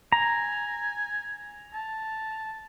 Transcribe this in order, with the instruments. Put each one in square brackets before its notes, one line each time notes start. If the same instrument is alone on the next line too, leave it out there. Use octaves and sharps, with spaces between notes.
[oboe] G#5 [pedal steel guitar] A#5
[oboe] A5